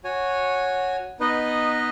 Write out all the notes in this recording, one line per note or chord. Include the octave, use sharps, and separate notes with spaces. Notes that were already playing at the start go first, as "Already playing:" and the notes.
F#4 C#5 G#5
B3 D#4 B4 D#5